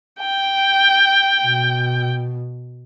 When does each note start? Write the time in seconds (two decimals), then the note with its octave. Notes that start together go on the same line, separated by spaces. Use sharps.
0.20 G5
1.43 B2